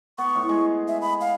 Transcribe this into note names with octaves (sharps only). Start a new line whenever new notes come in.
B3 C#6
A2
G#3 G#4
E5
B5
F5